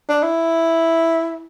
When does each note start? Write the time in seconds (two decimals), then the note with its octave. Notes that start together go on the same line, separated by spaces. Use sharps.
0.09 D4
0.23 E4